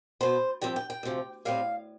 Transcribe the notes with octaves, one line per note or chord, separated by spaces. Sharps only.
B2 B3 C5
G2 F3 C4 G5
G5
G5
D2 C3 F3
A2 G3 C4 F5